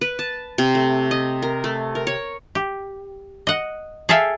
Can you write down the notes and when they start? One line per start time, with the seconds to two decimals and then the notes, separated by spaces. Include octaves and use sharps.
0.01 B4
0.19 A5
0.58 C3
0.75 A3
1.11 D#5
1.42 A#4
1.64 A3
1.95 A#4
2.07 C#5
2.55 G4
3.47 D#5 F#5
4.09 G#4 A4 E5 F5 G5